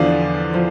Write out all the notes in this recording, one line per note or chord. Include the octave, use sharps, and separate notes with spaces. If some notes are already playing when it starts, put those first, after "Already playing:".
Already playing: E2 D3 F3 D5 F5
F3